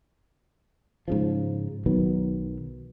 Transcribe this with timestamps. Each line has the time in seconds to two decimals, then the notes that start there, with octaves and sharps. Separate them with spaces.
1.08 G#2 C#3 F3
1.86 B1 D#3 F#3 B3